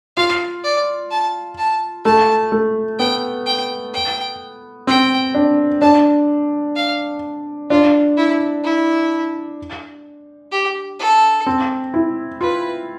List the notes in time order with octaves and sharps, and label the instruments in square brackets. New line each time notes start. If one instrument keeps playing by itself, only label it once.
[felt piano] F4 [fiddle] F5
[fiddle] D5
A5
A5
[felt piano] A3 [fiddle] A5
[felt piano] A3
[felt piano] B3 [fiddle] G5
[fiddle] G5
G5
[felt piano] C4 [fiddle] G5
[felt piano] D4
[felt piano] D4 [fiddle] A5
[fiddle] F5
[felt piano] D4 [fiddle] F4
[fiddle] E4
E4
G4
A4
[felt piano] C4
E4
[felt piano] F4 [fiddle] B4